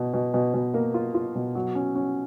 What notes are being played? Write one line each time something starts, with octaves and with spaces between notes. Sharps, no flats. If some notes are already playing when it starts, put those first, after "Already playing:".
Already playing: B2
B2
B2
B2
A#3
F4
F4
B2
F#3
C#4
C#4